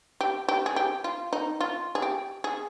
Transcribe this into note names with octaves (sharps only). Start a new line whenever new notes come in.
G4
G4
G#4
G4
F4
D#4
F4
G#4
G4
G#4